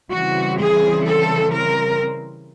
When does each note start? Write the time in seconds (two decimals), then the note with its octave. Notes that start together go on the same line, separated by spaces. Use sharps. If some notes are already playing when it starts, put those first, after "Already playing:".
0.11 C#3 E3 G3 C4 F#4
0.59 G#4
1.06 A4
1.53 A#4